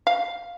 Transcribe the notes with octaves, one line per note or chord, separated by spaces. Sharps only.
F5